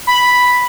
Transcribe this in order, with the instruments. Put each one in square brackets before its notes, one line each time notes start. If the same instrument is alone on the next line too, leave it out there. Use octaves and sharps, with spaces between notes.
[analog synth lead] B5